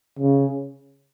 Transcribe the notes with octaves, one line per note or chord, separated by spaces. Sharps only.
C#3